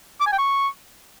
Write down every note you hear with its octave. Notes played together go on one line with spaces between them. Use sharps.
D6
G#5
G5
C#6